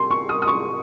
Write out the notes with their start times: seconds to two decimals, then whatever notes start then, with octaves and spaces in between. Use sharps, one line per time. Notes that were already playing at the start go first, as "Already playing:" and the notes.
Already playing: C3 C6
0.11 C#6
0.29 D#6
0.42 D#6
0.47 C#6